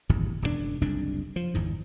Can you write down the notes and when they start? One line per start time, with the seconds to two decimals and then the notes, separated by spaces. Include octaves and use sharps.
0.09 D1 G#1 E2 G2
0.42 E1 F#2 A#2 D4
0.81 F#1 C2 F2 D4
1.36 F3
1.54 G1 E2 G#2